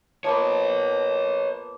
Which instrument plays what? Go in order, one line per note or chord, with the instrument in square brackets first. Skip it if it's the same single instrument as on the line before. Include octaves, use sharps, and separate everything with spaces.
[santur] F3 A#3 B3 [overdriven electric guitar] B4 C#5